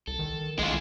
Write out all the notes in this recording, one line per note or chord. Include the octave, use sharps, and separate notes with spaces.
C2 A4
D#3
B1 G#3 E4 F4 G#4